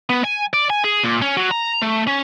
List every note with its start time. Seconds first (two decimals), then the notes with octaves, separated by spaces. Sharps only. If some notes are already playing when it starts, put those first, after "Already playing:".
0.10 B3
0.24 G#5
0.53 D5
0.70 G#5
0.84 G#4
1.04 A#2
1.22 C#4
1.37 F#3
1.51 A#5
1.82 A3
2.07 C#4